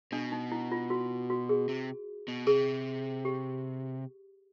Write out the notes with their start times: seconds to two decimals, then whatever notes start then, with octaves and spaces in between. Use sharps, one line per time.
0.12 B2 D4
0.32 D#4
0.52 E4
0.72 F4
0.90 F#4
1.30 F#4
1.49 G#4
1.69 C3
2.28 B2
2.46 C3 G#4
3.25 G4